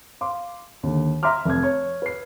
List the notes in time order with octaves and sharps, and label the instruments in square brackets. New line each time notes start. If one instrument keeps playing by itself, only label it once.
[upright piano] F5 C6 D6
D#2 D3
E5 A#5 C6 D6 F6
F1 G#6
C#5
B4 C7